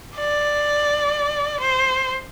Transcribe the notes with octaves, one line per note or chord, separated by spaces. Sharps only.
D5
C5